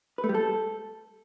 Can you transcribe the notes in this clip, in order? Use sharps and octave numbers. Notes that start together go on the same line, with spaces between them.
B4
A3
G3
A4